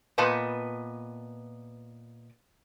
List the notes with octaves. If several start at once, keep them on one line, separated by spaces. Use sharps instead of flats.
A#2 B3 B4 D#5 A5